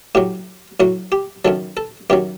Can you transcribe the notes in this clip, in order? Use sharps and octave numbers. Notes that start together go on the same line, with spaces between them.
A2 F#3 G4
A2 F#3 F#4
G4
F#2 D#3 F#3 A4
A4
F#2 D#3 F#3 G4